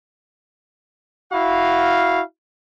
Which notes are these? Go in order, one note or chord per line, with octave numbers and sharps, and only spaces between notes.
E4 F#4 F5